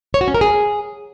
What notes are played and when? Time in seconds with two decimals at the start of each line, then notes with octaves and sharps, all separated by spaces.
0.14 C#5
0.21 F#4
0.28 C#4
0.34 A#4
0.41 G#4